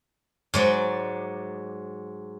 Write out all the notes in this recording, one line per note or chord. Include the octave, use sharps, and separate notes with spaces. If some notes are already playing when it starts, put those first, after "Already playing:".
G#2 F#3 D5